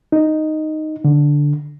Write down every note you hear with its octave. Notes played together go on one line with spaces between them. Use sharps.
D#4
D3